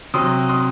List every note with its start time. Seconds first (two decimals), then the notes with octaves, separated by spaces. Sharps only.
0.14 C3 F#3 C4 C6 D#6
0.49 C6 D#6